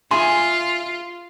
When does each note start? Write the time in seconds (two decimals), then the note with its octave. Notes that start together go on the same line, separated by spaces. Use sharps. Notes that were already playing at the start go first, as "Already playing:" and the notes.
0.11 F4 G#4 E5 G#5 C6